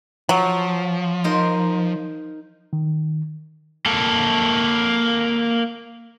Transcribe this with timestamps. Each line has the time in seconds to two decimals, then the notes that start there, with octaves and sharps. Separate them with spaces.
0.29 F3 F#3
1.24 D#4 A#4 C5
2.73 D#3
3.86 A#3 A4